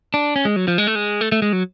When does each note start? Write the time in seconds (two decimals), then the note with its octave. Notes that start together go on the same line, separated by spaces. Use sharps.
0.14 D4
0.36 C#4
0.45 G#3
0.56 F#3
0.68 F3
0.78 G#3
0.87 A3
0.95 G#3
1.21 A3
1.32 A3
1.42 G#3
1.53 F#3